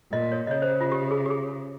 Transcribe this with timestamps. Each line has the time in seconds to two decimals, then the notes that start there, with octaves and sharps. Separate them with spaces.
0.12 A#2 D#5
0.32 C#5
0.47 D#5
0.51 C#3 C#5
0.62 C5
0.81 F4
0.92 G4
1.11 G#4
1.26 G4
1.30 G#4